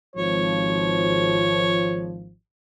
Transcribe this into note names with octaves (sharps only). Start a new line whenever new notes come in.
G#1 F3 C#5